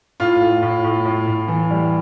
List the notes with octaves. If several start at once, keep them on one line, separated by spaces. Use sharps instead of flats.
A2 F4
A2
A2
A2
A2
A2
E3
G3